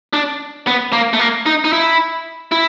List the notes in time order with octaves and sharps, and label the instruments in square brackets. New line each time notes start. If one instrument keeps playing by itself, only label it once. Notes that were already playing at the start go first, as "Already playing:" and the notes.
[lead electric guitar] D4
B3
A#3
A3
A#3
D#4
D#4
E4
E4